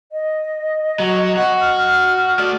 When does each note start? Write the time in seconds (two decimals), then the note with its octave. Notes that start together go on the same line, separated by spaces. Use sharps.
0.12 D#5
1.00 F#3
1.37 F#4
1.60 F6
2.39 A3 D5